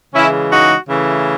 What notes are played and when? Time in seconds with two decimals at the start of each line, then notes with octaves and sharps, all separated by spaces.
0.15 C#3 E3 G#3 C#4 E4
0.52 D#4 F#4
0.89 C#3 E3 A3